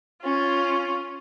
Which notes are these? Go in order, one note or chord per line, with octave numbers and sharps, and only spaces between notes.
C#4 F4